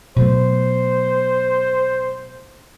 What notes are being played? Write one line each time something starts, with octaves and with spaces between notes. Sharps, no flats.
B2 F#3 A3 C5